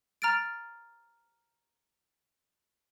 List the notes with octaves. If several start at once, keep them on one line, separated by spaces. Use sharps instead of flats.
A#5 F6 A6 D7